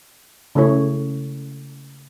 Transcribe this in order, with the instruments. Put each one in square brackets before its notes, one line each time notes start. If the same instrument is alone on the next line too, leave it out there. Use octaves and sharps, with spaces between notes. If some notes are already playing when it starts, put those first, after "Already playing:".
[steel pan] C#3 A3 E4 C#5